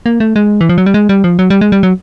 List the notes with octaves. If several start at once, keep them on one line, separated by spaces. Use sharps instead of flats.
A#3
A3
G#3
E3
F3
F#3
G3
G#3
G3
F3
F#3
G3
G#3
G3
F#3